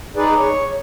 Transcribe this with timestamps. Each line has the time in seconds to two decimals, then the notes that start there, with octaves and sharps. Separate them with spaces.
0.16 D#4 G#4 B4 D5
0.38 C#5